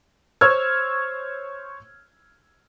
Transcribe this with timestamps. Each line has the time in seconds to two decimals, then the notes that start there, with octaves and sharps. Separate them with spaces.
0.41 C5 C#5 C#6 E6 F6 G#6